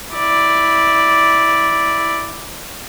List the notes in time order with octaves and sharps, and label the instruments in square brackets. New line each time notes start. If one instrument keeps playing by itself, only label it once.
[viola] E4 D5